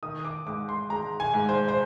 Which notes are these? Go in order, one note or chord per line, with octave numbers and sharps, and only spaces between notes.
D#3 D#6
D6
G#2 D6
C6
G#3 A#5
G#5
G#2
C5
C5